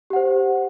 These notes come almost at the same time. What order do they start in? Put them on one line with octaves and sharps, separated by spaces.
G4 F#5 C5